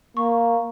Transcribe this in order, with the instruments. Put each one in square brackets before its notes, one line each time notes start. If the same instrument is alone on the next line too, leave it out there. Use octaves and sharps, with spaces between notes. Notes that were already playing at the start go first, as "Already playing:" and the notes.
[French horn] A#3 [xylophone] C#6